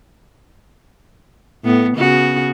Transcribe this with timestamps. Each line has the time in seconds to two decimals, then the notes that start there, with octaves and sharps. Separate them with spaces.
1.64 A2 B3
1.98 C#3 B3 F#4